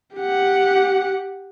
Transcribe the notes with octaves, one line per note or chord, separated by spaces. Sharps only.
G4 F#5